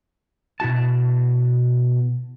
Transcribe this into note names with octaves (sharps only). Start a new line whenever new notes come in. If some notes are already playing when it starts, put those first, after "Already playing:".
B2 E4 F#4 A5